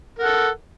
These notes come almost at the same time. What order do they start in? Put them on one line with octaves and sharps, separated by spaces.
A#4 F#5 A4